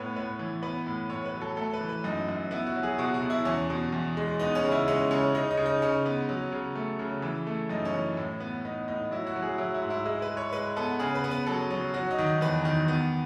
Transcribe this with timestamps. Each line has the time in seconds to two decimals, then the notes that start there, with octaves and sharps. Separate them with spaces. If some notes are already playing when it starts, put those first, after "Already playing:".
Already playing: A2 B3 B4 C#5
0.16 A2 B4
0.39 E3
0.63 B3 B4
0.86 A2
1.10 A2 C#5
1.26 B4
1.34 F#3
1.41 A4
1.57 A3 A4
1.73 B4
1.81 E3
1.89 B4
2.04 F#2 D#4
2.29 F#2
2.51 B3 E4
2.67 F#4
2.75 F#3
2.83 G#4
2.98 B2 F#4
3.14 F#4
3.22 B2
3.30 E4
3.45 E2 C#4
3.70 B2
3.92 E2
4.17 G#3
4.39 B3 D#4
4.55 C#4
4.64 C#3
4.71 E4
4.88 G#3 C#4
5.11 C#3 C#4
5.35 C#3 D#4
5.51 D#4
5.57 C#3
5.66 D#4
5.82 C#3 C#4
6.05 B3
6.29 F#3
6.52 C#3
6.75 A3
6.99 C#3
7.22 E3
7.47 A3
7.69 F#2 D#4
7.85 C#4
7.94 E3
8.17 A2
8.40 B3
8.65 B3 D#4
8.88 A2 D#4
9.11 F#3 E4
9.27 F#4
9.36 F#3
9.42 G#4
9.58 F#3 E4
9.74 E4
9.82 G#2
9.90 E4
10.05 G#3 E4
10.22 B4
10.29 G#3
10.37 C#5
10.53 G#3 B4
10.76 B3 A4
10.99 C#3 G#4
11.15 B4
11.24 B3
11.31 B4
11.47 F#3 A4
11.71 F#3
11.94 F#3 F#4
12.11 D#4
12.19 D#3
12.26 D#4
12.41 E2 B4
12.65 D#3
12.88 B3